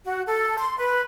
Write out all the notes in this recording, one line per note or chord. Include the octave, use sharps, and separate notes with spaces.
F#4
A4
C6
B4